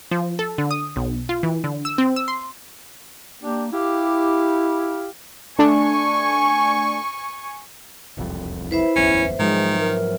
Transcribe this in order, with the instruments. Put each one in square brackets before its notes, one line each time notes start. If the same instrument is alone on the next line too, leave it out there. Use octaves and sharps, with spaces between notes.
[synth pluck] F3
A4
D3
D#6
B1
F4
E3
D3
E6
C4
E6
C6
[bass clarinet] A#3 [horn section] D4 G4
[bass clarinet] E4 [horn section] G4 F5
[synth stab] A3 D4 [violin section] G#5 C#6
[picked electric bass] E1 C2 F2
[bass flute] E4 [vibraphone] B4 C5 E5
[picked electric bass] D1 G1 E2 [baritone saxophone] C#4
[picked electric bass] G#2 F3 F#3 [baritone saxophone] D#3 [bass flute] G#3
[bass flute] A#4